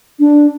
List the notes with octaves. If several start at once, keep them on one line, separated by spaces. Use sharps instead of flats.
D4